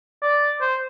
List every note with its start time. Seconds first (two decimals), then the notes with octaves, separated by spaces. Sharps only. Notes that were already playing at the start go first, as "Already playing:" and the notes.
0.22 D5
0.61 C5